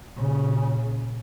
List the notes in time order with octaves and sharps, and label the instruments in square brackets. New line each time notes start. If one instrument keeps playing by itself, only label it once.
[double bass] A#2 C#3